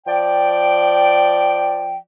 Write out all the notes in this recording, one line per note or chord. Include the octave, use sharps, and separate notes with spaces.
F3 D5 G5